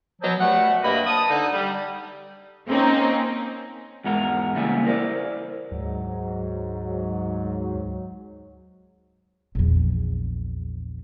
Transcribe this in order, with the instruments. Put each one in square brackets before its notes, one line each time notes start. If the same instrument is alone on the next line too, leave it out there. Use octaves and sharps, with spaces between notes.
[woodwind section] B2 F3 F#3
B2 G3 A3 F#5
G2 C3 A#3 A#4 D#5 B5
A5 D#6
D3 D#4
G3
[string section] A#3 C4 C#4 D#4
[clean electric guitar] E2 G#2 G#3 F#4 A#4 A#5
C#3 E3 G3 A#3 E4 G#5
E4 A#4 C5 D5
[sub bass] D2 [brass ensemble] G#2 F#3
[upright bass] A#1 E2